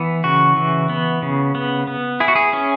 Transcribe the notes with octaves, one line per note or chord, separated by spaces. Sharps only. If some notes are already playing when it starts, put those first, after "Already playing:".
Already playing: E3 B3
C#3 F#4
E3
B3
C#3
B3
B3
E4 G#4
F#4
G#4
C#4